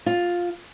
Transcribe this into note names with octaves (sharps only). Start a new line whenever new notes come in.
F4